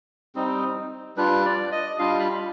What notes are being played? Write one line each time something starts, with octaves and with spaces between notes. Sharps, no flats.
G3 C4 D#4
G3 D4 F4 B4
D5
D#5
G3 D4 F4 F5
B5